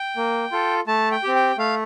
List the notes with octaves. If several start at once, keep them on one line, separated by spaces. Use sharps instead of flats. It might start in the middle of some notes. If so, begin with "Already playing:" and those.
Already playing: G5
A#3
F4 A4
A3 A5
G5
C4 G4
G5
A3 F5